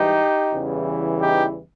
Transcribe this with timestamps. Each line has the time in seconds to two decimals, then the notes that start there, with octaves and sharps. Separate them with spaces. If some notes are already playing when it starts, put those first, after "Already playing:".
Already playing: G#2 E3 G3 D#4 G4
0.53 E2 C#3 E3 G3
1.21 D#4 G4